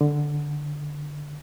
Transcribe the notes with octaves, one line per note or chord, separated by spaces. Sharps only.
D3